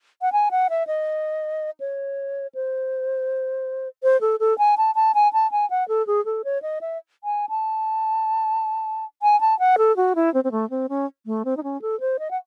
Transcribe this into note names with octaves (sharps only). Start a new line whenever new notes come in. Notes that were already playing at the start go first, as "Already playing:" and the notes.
F#5
G#5
F#5
E5
D#5
C#5
C5
C5
A4
A4
G#5
A5
A5
G#5
A5
G#5
F#5
A4
G#4
A4
C#5
D#5
E5
G#5
A5
G#5
A5
F#5
A4
F#4
E4
C4
C4
A3
C4
C#4
A3
C4
D#4
C#4
A4
C5
D#5
F#5